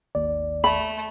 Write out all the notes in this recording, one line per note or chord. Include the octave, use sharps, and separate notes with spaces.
G#1 D#2 D5
A3 B5